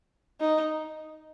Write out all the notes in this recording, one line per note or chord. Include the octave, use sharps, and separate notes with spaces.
D#4